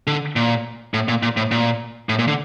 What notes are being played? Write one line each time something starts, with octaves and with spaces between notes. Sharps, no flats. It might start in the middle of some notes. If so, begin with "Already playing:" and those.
D3
A#2
A2
A#2
A#2
A2
A#2
A2
A#2
D3